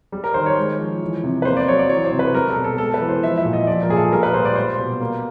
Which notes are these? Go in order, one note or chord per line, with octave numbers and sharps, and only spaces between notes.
G3
A#4
D#3 C5
C#5
G#3
F3
E3
C3
B4
A#3 C5
D5
F#3 C#5
D5
E3 C#5
C5
C3
B4
G3 A#4
A4
B2
A4
G#3 A4
B4
E3
C5
F3 E5
E5
A#2
D#5
F3 D5
A#4
A#2 G#4
A4
G3 A#4
B4
A#2 C5
D5
G3 C5
B2
A#3